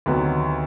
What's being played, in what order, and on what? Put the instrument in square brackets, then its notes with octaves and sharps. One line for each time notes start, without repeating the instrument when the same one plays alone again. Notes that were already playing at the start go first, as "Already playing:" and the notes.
[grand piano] D2 C3 D#3 F#3 B3